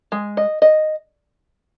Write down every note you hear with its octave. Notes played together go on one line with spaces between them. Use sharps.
G#3
D#5
D#5